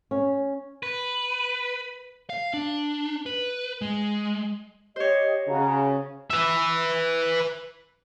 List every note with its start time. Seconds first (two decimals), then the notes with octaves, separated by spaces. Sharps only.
0.11 C#4
0.83 B4
2.30 F5
2.54 D4
3.26 B4
3.82 G#3
4.96 G4 C5 C#5 D#5
5.48 C#3 F#4 A#5
6.31 B4 E5